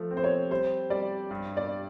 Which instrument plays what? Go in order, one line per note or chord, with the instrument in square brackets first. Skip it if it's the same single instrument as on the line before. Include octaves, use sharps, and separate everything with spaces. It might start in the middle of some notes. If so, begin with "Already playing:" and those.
Already playing: [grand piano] F3 A3
C4
[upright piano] C5
C#5
[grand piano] G3 [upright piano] C5
[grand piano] G3 [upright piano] D5
[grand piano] G2
[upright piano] D5